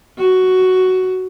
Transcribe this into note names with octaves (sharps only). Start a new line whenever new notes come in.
F#4